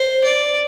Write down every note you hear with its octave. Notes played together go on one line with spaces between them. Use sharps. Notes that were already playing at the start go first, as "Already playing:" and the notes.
Already playing: C5
D5